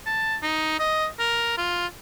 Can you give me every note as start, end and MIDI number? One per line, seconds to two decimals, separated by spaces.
0.06 0.36 81
0.42 0.78 63
0.79 1.07 75
1.19 1.54 70
1.58 1.86 65